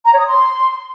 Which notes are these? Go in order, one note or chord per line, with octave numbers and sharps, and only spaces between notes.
A#5
C#5
D#6
C6